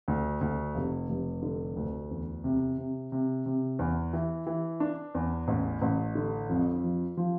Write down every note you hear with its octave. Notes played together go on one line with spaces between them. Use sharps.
D2
D2
F1
F1
D3
D2
E2
C3
C3
C3
C3
E2
E3
E3
D4
E2
A1
A1
D3
F2
F3
F3